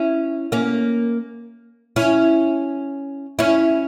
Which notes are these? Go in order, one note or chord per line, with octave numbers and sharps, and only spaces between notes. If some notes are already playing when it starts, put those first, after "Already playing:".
Already playing: C#4 E4
A#3 C#4
C#4 E4
C#4 E4